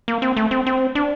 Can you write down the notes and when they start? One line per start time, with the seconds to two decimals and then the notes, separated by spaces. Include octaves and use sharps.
0.08 A#3
0.22 C4
0.37 A3
0.51 C4
0.66 C4
0.95 D4